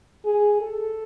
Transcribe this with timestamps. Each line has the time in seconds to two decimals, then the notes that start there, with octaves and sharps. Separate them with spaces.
0.25 G#4
0.61 A4